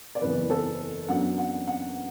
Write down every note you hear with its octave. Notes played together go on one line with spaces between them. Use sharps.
D5
F#1 E2 E3 B4
A4
F#2 F#3 B3 D4 F#5
F#5
F#5